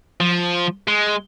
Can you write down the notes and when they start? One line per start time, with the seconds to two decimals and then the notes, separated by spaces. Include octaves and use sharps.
0.20 F3
0.88 G#3